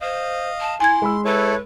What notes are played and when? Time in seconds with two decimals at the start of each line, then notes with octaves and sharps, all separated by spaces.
0.01 C5 D#5 F5
0.60 A5
0.80 E4 G#5 C6 G#6
1.02 G#3 B5 E6
1.25 E4 A4 B4 C#5